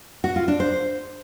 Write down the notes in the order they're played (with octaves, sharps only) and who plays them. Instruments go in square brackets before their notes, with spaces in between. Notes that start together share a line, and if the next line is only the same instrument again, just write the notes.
[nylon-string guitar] F#4
F4
D4
C5